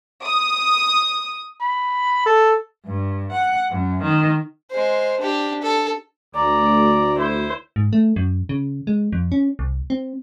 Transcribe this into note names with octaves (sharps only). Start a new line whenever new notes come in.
D#6
B5
A4
G2
F#5
F#2
D#3
G#3 C5
D4 G4
A4
D2 D5 A#5
E4 C5
G#2
A3
F#2
C#3
G#3
F2
C#4
C2
C4